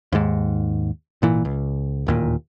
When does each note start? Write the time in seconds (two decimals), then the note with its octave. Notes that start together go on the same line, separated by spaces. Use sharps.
0.12 D#2 G#2
1.22 G#1 A#2 E3
1.45 C#2
2.07 D1 D#2 A#2